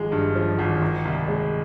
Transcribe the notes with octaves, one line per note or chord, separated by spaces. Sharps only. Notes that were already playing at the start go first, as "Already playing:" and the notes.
Already playing: G#1 F3 G#3
G2
F3
G#1
D#3
C2
G#3